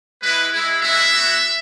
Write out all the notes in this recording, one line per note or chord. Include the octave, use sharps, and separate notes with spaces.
G#3 E4 B4
G#3 E4
G#3 C#4 E4 F#4 E5
B3 F#4